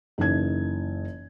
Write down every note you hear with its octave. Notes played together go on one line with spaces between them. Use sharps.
F#1 E3 D#4 G#6